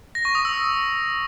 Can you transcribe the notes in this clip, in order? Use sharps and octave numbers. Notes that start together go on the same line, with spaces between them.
A#6
C#6
D#6
E6